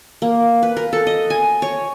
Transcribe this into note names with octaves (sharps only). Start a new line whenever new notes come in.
A#3
B4
A#4
A4
D#5
G#5
C#5